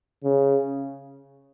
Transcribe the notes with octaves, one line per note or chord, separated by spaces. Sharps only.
C#3